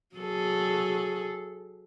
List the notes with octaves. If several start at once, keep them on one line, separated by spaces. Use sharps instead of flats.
F#3 G#4 A4